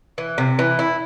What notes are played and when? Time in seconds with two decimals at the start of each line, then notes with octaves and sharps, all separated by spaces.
0.18 E3
0.38 C3
0.59 E3
0.79 E4